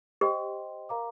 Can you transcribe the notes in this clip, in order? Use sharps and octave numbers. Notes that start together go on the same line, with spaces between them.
G4 C5 D#5 G5 C6
A#4 F5 A#5 D6